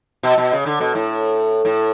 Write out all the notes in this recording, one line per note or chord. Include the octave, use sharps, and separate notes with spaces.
B2
B2
C#3
D3
B2
A2
A2